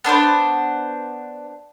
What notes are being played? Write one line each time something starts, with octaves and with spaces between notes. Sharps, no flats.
B3 D4 A#4 C5